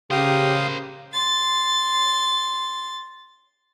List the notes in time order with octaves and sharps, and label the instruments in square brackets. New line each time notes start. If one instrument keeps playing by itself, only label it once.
[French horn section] C#3 [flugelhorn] G4 [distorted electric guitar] A#4 C5 [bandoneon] F5 D#6
[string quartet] C6 A6